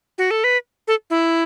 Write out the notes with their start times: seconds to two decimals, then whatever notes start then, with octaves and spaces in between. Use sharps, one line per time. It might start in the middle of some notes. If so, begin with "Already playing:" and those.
0.18 F#4
0.31 A4
0.44 B4
0.88 A4
1.10 E4